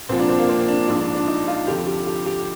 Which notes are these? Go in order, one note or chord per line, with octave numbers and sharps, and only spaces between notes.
C2 A#2 F3 C4
D4
C4
A#3
C4
D4
A#1 G#2 F3 D4
D4
D4
D#4
F4
F1 F2 D3 F3 G4
G4
G4
G4